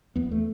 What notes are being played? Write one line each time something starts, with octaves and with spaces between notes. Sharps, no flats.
E2 B3
A3